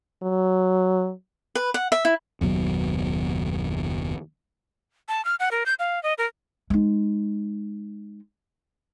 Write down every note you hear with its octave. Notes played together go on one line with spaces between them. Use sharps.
F#3
B4
F#5
E5
E4
F#1 D#2 B2 F#3
A5
F6
F#5
A#4
G6
F5
D#5
A#4
G#3 D#4